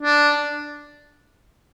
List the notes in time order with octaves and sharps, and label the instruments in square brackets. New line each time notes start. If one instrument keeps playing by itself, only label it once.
[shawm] D4